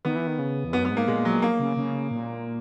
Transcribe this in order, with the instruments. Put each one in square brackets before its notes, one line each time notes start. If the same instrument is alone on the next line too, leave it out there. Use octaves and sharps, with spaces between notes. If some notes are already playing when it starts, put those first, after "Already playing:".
[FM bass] D#3 [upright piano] B3
[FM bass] E3
D#3
C#3
E2
[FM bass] F#2 [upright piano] B3
[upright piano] B3
[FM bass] G#2
[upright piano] A#3
[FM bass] A#2 [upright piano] G#3
[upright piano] F#3
A#3
[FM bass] C#3
C#3
A#2